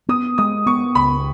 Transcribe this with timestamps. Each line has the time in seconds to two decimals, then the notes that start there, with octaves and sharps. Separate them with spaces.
0.08 B3 D#6
0.38 G#3 D#6
0.66 B3 C#6
0.95 C#2 B5